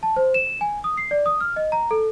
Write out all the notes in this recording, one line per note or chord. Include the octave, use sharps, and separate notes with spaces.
A5
C5
E7
G#5
D#6
C7
D5
D#6
F6
D#5
A#5
A4